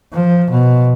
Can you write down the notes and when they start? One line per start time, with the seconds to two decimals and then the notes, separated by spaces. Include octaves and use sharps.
0.13 F3
0.51 B2